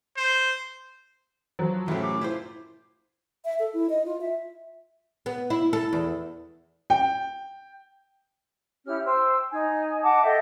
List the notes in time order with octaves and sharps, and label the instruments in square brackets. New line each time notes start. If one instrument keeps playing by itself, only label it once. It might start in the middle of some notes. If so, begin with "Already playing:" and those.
[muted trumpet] C5
[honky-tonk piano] F3 F#3
[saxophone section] F#2 A2 [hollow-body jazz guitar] E3 G4 [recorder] E5
[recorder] D6
[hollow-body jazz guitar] E4 F4 C5
[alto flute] E5
A4
E4
D#5
F4
E5
[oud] B3
E4
A4
E2
[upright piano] G5
[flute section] C#4 E4 G4 F6
C5 G5 E6
D#4 G#5
D#5 F#5 A5 D6
A4 D#5 E5 G5